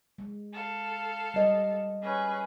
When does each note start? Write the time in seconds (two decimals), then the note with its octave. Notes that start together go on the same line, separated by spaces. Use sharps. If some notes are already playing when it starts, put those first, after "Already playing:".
0.18 G#3
0.52 A4 F5
1.34 G3 D#5
2.01 C#4 G#4 B4